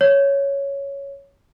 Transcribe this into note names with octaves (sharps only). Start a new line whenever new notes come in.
C#5